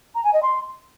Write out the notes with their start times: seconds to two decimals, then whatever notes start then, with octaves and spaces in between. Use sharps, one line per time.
0.15 A#5
0.24 G#5
0.33 D#5
0.42 C6